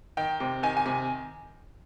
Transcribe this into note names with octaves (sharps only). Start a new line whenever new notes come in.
D#3 G5
C3
D#3 G#5
G#5
C3